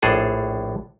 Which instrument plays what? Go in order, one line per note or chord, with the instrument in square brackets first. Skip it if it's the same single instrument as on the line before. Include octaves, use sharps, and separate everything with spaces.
[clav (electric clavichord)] A#1 A2 D4 G#4 A4